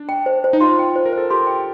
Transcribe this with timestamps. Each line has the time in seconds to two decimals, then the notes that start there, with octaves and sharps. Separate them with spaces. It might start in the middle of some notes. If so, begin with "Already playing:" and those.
Already playing: D4
0.09 G5
0.26 C5
0.44 C5
0.53 D#4
0.61 F4 C6
0.79 G5
0.96 C5
1.06 A#4
1.13 A4 C5
1.30 G4 C6
1.47 G5